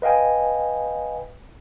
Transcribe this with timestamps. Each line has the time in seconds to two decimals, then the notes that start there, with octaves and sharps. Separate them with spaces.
0.02 B4 D#5 F5 G5 G#5